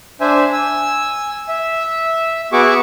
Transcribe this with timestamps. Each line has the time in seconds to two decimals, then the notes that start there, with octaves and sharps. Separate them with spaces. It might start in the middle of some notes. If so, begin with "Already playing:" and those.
0.21 D4 C5 E5 G#5
0.53 G#5 E6
1.48 E5
2.52 B3 F#4 G#4 E5 C#6 D6